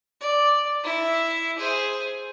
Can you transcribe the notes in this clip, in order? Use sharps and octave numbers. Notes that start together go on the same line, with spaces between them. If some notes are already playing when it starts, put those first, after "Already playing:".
D5
E4 E5
G#4 C5